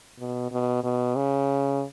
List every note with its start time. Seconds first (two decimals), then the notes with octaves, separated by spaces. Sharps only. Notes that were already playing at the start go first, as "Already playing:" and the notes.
0.20 B2
0.52 B2
0.83 B2
1.16 C#3